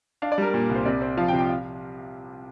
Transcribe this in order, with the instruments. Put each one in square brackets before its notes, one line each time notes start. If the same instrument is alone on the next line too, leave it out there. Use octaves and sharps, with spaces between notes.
[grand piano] D4 F5
D5
G3 A#4
A#2
C2
C5
C3 D5
C4
F3 F5
G5
C3
G5
F5